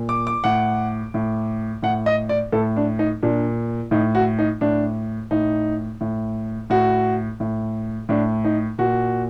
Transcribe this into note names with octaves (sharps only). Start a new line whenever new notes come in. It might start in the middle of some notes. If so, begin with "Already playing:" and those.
Already playing: A#2
D6
D6
A2 F#5
A2
A2 F#5
D#5
D5
A2 A4
D4
D#4
A#2 D4
A2 D#4
F#4
D#4
A2 D4
A2 D#4
A2
A2 F#4
A2
A2 D4
D#4
A#2 F#4